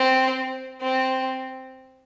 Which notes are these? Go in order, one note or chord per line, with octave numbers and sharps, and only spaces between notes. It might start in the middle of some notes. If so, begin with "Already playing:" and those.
Already playing: C4
C4